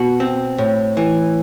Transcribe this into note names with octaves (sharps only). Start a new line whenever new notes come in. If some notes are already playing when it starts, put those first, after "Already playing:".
Already playing: B2 F#4
C4
A2
E3